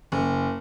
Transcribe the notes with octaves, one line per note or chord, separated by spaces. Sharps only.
F#1